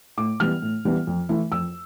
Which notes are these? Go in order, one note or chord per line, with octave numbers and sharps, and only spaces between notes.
A2 D6
E3 G3 B3 F6
A2
E3 G3 B3
F2
E3 A3 E4
F2 E6